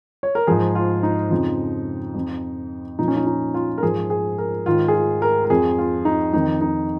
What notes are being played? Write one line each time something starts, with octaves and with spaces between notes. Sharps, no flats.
C#5
A#4
G#2 F3 G#4
F4
D#4
F2 C#3 F3
F2 F3
A#2 F3 D#4
C#4
D#4
D#4
F4
A#4
G#2 F3 G#4
G#4
A#4
G#2 D#3 F4
G#4
F4
A#4
A#4
F2 F3 G#4
F4
D#4
F2 D#3 D#4
D#4